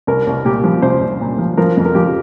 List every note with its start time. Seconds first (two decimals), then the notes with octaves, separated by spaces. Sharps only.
0.07 C2 A#4
0.27 C2
0.45 A#2 G4
0.64 F3
0.82 C2 C5
1.01 C2
1.21 A#2
1.39 F3
1.57 F3 A#4
1.77 F2
1.85 A#4
1.95 F3 G4